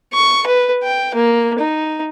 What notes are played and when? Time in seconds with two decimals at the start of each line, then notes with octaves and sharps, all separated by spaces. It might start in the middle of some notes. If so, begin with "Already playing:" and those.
0.13 C#6
0.46 B4
0.83 G5
1.14 A#3
1.59 D#4